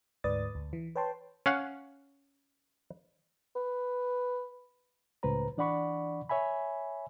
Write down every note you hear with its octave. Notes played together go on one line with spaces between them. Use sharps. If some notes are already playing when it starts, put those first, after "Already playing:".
D2 G#2 B4 D5 D#6 A6
D2
E3
B4 C#5 G5 A5 C6
C#4 F5 F#5
B4
C#2 A2 B4 C5 A#5
E3 D4 D5 F#5 B5 C#6
C#5 E5 G#5 B5